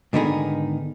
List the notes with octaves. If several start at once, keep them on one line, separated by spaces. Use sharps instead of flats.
G#2 D3 D#3 B3 D#4 G#4